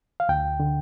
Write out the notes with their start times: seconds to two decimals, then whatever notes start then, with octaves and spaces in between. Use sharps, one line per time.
0.20 F5
0.29 D2 G5
0.60 D3